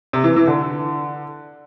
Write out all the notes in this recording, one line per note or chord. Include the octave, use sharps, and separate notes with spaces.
C3
E3
E3
D3